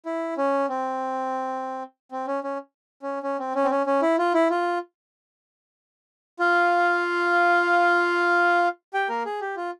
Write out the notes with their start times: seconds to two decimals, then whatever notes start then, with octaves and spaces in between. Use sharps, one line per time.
0.06 E4
0.38 C#4
0.69 C4
2.12 C4
2.27 C#4
2.44 C#4
3.02 C#4
3.23 C#4
3.39 C4
3.55 C#4
3.64 C4
3.71 C#4
3.86 C#4
4.02 E4
4.18 F4
4.34 E4
4.50 F4
6.39 F4 F5
8.94 G4 G5
9.09 A#3 A#4
9.26 G#4
9.41 G4
9.56 F4